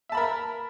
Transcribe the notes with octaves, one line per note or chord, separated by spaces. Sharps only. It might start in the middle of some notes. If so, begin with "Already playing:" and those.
A#4 E5 A5 B5